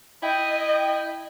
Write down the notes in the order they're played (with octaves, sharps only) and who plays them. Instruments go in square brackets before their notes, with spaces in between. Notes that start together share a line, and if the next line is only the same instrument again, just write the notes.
[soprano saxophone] E4 [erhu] D#5 [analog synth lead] G5